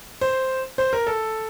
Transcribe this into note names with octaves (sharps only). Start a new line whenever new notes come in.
C5
C5
A#4
A4